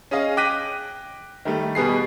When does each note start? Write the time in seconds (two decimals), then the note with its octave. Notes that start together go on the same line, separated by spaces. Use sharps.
0.11 C#4 G#4 D#5 F5
0.37 G5 D6 F#6 A#6 B6 D#7
1.45 D#3 G3 A3
1.75 B2 G3 B3 G#4 C7